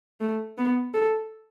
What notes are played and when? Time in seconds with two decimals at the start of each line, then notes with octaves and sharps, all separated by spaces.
0.21 A3
0.58 B3
0.94 A4